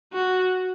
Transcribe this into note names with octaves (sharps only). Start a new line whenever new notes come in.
F#4